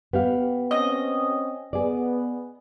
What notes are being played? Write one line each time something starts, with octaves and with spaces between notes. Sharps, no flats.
B3 G4 F5
C4 C#4 D#5
B3 G#4 D5